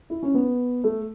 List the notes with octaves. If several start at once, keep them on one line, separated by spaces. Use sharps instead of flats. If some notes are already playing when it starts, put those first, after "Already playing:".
E4
C#4
B3
A3